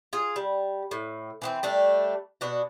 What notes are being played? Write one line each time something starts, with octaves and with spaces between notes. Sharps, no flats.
F4 G#4
G3
A2
E3 B3 C4
G3 A3 D4
B2 D4 F#4